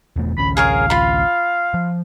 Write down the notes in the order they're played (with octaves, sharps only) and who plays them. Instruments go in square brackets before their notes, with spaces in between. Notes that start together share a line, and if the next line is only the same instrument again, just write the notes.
[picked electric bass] E1 E2 A3
[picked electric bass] A1 D2 C#4 [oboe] B5
[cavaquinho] G#4 A#4 C#5 [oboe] F5
[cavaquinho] F4 B5
[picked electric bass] F3